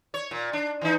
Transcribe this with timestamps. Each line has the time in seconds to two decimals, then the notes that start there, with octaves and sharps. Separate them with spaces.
0.14 C#5
0.31 A#2
0.53 D4
0.81 E3 D#4